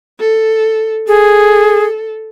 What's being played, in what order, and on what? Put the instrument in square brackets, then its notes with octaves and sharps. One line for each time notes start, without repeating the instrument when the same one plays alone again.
[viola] A4
[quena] G#4 [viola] A4